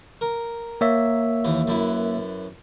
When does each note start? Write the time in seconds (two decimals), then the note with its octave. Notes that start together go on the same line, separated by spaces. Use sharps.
0.21 A#4
0.81 A#3 C#5 E5
1.45 D#2 E3
1.67 F#2 E4 B4